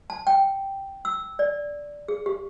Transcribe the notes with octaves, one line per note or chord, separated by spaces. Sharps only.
A5
G5
E6
D5
G#4
G4